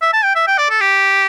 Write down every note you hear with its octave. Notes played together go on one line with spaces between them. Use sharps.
E5
A5
G5
E5
G5
D5
A4
G4